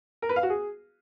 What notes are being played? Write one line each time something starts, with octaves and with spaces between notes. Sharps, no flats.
A#4
B4
F5
F#4
G#4